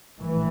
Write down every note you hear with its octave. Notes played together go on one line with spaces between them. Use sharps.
A#1 A2 E3